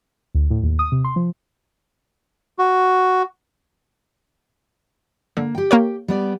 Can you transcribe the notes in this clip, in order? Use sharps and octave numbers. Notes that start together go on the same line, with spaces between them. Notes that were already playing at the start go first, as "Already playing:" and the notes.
D2
A2
D#2
D#6
C3
C6
F3
F#4
D3 A#3
G4 G5
A#3 A#4 C#5
G3 B3 D5